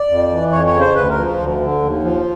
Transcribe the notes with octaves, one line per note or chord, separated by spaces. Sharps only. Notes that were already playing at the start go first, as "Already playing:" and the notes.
Already playing: D5
F2
E3
F2 C#5
C#5
C#3
C5
D2 B4
A#4
F3
D2
D3
D#2
F3